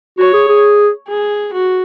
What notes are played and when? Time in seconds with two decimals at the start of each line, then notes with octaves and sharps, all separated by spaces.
0.18 F#4 C#5
0.33 G#4
0.48 G#4
1.08 G#4
1.53 F#4